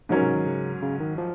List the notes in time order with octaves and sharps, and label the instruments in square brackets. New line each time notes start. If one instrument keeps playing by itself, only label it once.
[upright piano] G#2 F#3 C#4 F#4 A#4 [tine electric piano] F3
[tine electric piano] C3
D#3
C#3
C#3
D#3
F3